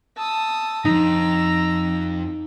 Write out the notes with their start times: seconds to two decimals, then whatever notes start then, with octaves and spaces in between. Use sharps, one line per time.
0.18 A5 D#6 E6
0.85 F2 G#2 D#4 A#5 E6